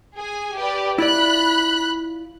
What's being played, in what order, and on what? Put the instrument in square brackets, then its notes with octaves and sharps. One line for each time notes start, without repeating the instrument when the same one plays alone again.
[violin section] G#4 G#5
G4 B4 D5
[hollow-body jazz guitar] E4 F4 D5 [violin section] B5 F#6